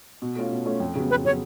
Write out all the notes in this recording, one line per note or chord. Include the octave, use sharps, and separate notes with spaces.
B2
A3 C#4 F4
B2
A3 C#4 F4
F2
C#3 F#3 B3
F2 B4
C#3 F#3 B3 C#5